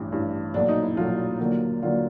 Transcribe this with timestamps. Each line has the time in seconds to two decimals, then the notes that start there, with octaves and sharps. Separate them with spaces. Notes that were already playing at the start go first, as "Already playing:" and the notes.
Already playing: A1 G2 E3
0.11 A1 G2 E3
0.54 B1 A#2 F#3 A3 D4
0.69 D#4
0.83 E4
0.97 B1 A#2 F#3 A3 F4
1.40 D#2 D3 F#3 A#3
1.83 D#2 D3 F#3 A#3 F4